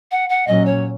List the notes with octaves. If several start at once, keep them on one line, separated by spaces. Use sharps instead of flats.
F#5
F#5
A#2 F#3 C#4 D#5
C#5